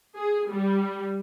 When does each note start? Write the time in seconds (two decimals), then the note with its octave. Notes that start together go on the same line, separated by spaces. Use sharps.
0.15 G#4
0.48 G3